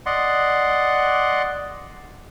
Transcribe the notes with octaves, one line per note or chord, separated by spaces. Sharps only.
D5 D#5 F#5 C6